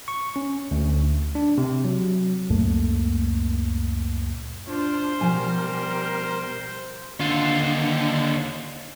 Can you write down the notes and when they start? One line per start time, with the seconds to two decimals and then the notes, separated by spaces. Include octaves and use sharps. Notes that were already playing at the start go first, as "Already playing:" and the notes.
0.08 C#6
0.36 C#4
0.71 D2
1.35 D4
1.58 C3
1.85 F#3
2.50 C#2 F#2 A#2 A3
4.68 D4 F4 C5
5.21 B2 F3 G3 A#4 G#5
7.21 D#2 D3 F4